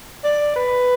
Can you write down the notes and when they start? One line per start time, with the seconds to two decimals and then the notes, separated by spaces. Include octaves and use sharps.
0.25 D5
0.56 B4